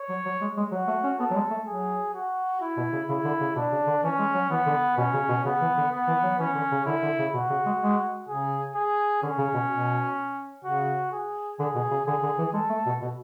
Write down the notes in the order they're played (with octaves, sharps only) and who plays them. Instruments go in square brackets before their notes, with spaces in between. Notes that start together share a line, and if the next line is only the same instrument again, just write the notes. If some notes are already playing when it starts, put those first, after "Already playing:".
Already playing: [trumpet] C#5
[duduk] F#3
F#3
G#3
G#3
[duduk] F#3 [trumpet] F#4
[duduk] A3
C#4
[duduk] B3 [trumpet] A4
[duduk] F#3
G#3
A3
[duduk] F#3 [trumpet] G#4
[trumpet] F#4
E4
[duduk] B2
C#3
[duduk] C#3 [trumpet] E4
[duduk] D3
C#3
[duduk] B2 [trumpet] D4
[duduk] C#3
D3
[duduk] E3 [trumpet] C#4
[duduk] G#3
F#3
[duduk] E3 [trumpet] B3
[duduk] D3
[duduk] B2 [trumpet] C#4
[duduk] C#3
B2
[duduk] C#3 [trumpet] B3
[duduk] E3
D3
[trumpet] B3
[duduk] E3
F#3
[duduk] E3 [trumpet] C#4
[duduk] D3
C#3
[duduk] D3 [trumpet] E4
[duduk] D3
C#3
[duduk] B2 [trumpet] F#4
[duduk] C#3
G#3
G#3
[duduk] C#3 [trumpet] G#4
[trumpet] G#4
[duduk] D3 [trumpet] C#4
[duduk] C#3
B2
B2
[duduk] C#3 [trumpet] F#4
[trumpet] G#4
[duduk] D3 [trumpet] G#4
[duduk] B2
C#3
[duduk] D3 [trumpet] G#4
[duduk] D3
E3
[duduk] G#3 [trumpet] A4
[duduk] A3
B2
B2